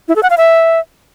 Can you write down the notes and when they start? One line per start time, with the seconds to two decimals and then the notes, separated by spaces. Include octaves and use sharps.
0.08 E4
0.16 A4
0.23 F#5
0.30 F5
0.37 E5